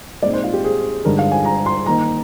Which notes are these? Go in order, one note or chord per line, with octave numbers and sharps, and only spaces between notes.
A#2 G#3 C4 D#4 D5
C5
F4
G4
G#4
G2 D3 G#3 D#4 A#4
F5
G#5
A#5
C6
D#3 A#3 D#4 A#5